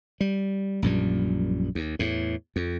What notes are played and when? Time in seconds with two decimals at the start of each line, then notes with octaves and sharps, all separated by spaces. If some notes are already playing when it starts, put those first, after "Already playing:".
0.21 G3
0.82 A#1 F#2 A#2 G3
1.75 D#2
1.99 E2 A2
2.56 F2